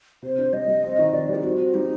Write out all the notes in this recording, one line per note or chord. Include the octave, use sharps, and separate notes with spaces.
C3 C5
D4
G3 D#5
G3
C4
D#3
D#3 D5
G3
D#4
C4 F#4
C4
G3 D#4